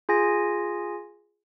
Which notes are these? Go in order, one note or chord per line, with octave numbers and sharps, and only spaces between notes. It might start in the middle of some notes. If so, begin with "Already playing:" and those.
F4 G#4 G#5 A#6